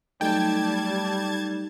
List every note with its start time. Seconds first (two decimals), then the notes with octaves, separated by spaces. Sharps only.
0.21 F#3 G3 A3 D#4 G5 A5 G#6